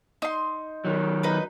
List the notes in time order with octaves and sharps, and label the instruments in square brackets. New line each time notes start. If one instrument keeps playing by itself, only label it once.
[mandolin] D#4 C6
[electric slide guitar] D#3 F#3
[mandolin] D#4 B4